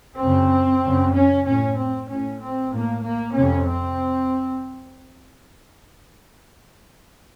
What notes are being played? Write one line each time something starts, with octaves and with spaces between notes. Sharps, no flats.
F#2 C#3 C4
F#2 C#3
C#4
A2 C#4
C4
A2 C#4
C4
A2 A#3
A#3
F2 C3 C#4
C4